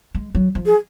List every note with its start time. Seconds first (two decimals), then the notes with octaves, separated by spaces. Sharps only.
0.15 G#3
0.35 F#3
0.55 F3
0.66 G#4